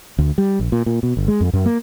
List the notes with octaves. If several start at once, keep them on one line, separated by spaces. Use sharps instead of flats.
D2
G3
A#1
A#2
A#2
B2
G1
G#3
F2
F#2
A#3